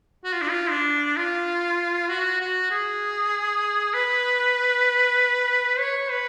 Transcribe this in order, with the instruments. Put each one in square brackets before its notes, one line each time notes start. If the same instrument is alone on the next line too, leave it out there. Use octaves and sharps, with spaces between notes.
[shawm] F#4
F4
D4
F4
D4
F4
F#4
F#4
G#4
B4
C#5
B4